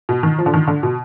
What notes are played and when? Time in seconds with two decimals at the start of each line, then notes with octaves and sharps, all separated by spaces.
0.09 B2
0.23 D#3
0.39 F3
0.46 D3
0.54 D#3
0.68 D3
0.83 B2